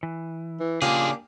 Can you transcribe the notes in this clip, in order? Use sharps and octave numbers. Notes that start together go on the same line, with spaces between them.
E3
E3
C#3 A#3 D4 F4 G4 G#4 G#5